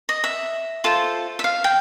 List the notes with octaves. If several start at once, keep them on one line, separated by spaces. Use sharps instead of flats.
D#5
E5
F4 A4 C5
E5
F5
G5